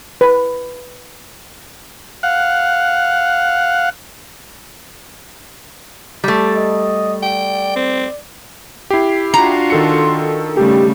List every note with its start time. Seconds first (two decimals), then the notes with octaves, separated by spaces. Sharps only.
0.21 B4
2.23 F5 F#5
6.24 G3 A3
6.56 D#5
7.23 D5 G5
7.76 C4
8.90 E4 G4 C7
9.34 D4 F4 F#4 A#5
9.70 D#3 A4 C6 C#7
10.57 C#3 G3 A3 G4